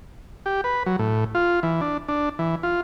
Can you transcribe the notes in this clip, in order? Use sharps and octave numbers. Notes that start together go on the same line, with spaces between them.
G4
B4
F#3
A2
F4
E3
D4
D4
E3
F4